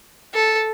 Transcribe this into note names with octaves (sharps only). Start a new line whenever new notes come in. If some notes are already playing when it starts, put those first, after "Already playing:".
A4